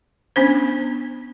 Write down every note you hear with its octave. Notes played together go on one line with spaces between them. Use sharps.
B3 C#4 D4 C5